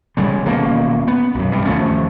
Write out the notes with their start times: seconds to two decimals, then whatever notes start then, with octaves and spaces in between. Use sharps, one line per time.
0.17 C#3 G3 G#3
0.45 D#1 B2 A#3 C#4
1.08 B3
1.35 B1 F#2
1.52 G2 C3
1.66 D#2 F3 A3 C#4